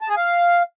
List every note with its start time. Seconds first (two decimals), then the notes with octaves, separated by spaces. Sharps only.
0.01 A5
0.09 G#4
0.17 F5